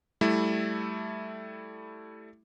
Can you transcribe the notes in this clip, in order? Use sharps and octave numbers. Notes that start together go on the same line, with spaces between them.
G3 A3 E4